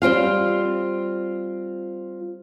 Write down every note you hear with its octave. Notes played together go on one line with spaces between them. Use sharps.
G3 C4 F4 F5